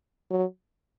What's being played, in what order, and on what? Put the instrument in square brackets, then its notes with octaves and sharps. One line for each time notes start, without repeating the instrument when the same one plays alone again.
[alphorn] F#3